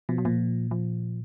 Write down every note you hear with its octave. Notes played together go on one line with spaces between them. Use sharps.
B2 F3
F#3
A#2 F3
F3